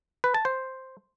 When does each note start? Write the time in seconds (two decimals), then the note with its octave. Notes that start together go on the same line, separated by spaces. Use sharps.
0.24 B4
0.34 A5
0.45 C5